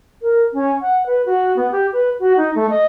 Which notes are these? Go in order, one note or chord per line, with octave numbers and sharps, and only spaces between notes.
A#4
C#4
F#5
B4
F#4
B3
G4
B4
F#4
D#4
A3
D#5